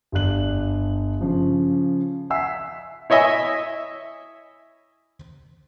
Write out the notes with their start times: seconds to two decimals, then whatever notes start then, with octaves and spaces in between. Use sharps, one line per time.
0.12 G1 G2 G4 D5 F#6 F#7
1.21 C#3 F3
2.30 E5 F#5 G#5 E6 B6 C7
3.10 E4 C#5 D#5 E5 G#5